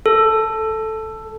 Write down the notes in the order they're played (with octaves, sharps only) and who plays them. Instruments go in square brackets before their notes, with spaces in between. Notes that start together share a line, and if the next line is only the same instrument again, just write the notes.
[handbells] A4